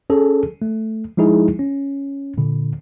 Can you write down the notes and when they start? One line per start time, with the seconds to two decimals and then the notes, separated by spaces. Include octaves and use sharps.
0.10 C#4 G#4 A4
0.62 A3
1.17 F3 G#3 D#4 E4 G#4
1.59 C#4
2.38 A#2 D3